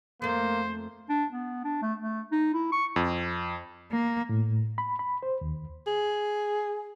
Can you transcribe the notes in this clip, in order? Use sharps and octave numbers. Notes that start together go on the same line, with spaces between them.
F2 A3 A#3 C5
D4
B3
D4
A3
A3
D#4
E4
C#6
F2
A#3
A2
B5
B5
C5
D#2
G#4